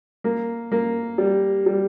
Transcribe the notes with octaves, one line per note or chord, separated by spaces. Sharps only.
A#3
A#3
G3
G3